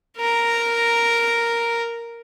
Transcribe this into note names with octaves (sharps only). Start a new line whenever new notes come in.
A#4 A#5